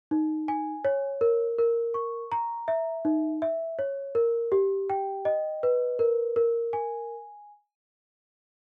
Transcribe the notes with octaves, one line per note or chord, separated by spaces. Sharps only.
D#4
G#5
C#5
A#4
A#4
C#6
A#5
E5
D#4
E5
C#5
A#4
G4
G5
D#5
B4
A#4
A#4
G#5